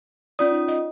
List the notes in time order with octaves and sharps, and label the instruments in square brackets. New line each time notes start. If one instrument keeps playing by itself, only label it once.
[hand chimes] C#4 F4 D#6 [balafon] D5
[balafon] D#4
D#5